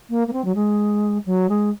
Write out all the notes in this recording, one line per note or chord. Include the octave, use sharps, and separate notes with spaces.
A#3
A#3
C4
F#3
G#3
F#3
G#3